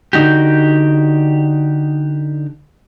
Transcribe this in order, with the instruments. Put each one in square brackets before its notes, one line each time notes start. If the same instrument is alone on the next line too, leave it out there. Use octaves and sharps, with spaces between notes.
[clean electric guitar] D3 D#4 F#4 G4